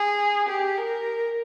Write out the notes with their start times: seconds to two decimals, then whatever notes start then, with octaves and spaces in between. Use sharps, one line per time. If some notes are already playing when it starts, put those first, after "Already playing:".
Already playing: G#4
0.48 G4
0.77 A#4